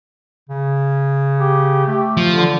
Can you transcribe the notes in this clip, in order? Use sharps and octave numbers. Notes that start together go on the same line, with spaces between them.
C#3
G4
A3
F3
D3